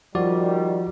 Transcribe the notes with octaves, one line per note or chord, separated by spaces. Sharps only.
D#3 F3 G3 F#4 D5